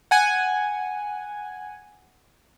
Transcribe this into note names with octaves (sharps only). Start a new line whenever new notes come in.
F#5 G#5